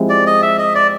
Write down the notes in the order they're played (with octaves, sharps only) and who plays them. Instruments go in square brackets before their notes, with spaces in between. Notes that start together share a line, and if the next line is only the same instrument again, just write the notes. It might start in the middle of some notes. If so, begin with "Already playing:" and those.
Already playing: [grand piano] F3 G#3 C4 E4 G4
[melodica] D5
D#5
E5
D#5
D5